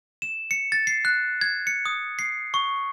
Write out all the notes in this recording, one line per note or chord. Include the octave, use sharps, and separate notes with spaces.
E7
C#7
A6
C7
F#6
G#6
C#7
D#6
C7
C#6